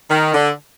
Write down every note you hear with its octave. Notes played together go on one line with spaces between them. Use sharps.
D#3
D3